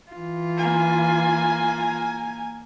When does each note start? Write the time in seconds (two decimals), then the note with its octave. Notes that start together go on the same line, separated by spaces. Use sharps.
0.12 E3 F4
0.58 A#3 G#5